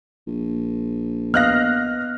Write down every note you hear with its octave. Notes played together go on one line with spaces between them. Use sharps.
A#1
B3 D#5 F5 F6 F#6 A#6